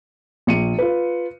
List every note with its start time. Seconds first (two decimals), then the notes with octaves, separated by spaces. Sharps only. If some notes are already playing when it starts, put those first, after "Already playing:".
0.47 A#1 C#7 D#7
0.79 F4 B4